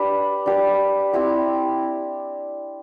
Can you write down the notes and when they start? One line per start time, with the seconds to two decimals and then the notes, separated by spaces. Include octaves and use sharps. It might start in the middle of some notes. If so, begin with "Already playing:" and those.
Already playing: D4 G4 B4
0.46 D4 G4 B4
1.13 C4 E4 G4